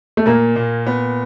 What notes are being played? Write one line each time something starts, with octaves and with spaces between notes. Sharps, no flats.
A3
A#2 A#3
A#2
B3